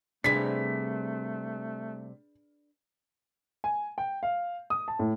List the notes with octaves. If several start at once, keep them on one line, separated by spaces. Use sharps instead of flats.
C3 G3 A3 D4 G#4 B4 B6
G#5
G5
F5
D#6
A5
A2